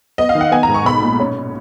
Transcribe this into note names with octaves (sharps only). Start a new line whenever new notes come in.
B3 D#5
F5
D#3
F#5
B3 G#5
A#5
G#2
C#6
B1 B5
A#2
C#4